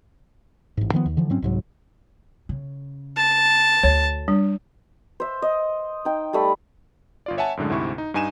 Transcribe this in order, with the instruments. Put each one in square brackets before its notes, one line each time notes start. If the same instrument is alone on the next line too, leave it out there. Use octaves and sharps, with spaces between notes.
[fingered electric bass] A1 G#2
D#3 F3 B3
D#2
D3 E3 F3
G#2 F#3 C4 C#4
C2 G#2 F#3
[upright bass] C#3
[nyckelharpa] A5
[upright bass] D2 [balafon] C#5
[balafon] G3 D4
[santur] C5 E5
D#5
D#4 G5
G3 A3 B5
[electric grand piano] G1 F4 D5
C#5 E5 F#5 G#5 A5
F#2 A2 D3 G#3
D2 G#2 C3 E4 C#6
D#4
G2 D#4 G#5 D#7 E7